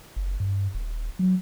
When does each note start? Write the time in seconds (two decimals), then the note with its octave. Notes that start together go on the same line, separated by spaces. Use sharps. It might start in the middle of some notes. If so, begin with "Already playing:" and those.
0.16 F#1
0.40 G2
0.74 D#1
1.19 F#3